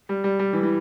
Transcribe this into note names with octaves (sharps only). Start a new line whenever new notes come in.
G3
G3
G3
E3
E3